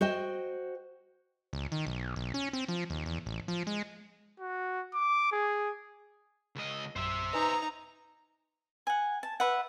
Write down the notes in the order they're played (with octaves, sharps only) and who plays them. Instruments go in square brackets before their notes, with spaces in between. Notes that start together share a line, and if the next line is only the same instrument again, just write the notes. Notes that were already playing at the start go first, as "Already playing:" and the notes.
[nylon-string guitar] F#4 C5 D#5 G5
[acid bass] C#2
D#3
B1
B1
C#4
C4
F3
D#2
E2
A1
F3
G#3
[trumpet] F#4
D6
G#4
[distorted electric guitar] C#2 D#5
[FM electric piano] A#1 F#2 [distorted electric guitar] C5 E5
[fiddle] D#4 A#5 [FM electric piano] B4 G#5 D#6
[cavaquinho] F#5 G#5
A5
B4 E5 F#5